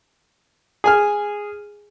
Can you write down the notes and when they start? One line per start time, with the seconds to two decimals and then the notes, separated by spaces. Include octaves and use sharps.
0.84 G#4 G#5 F6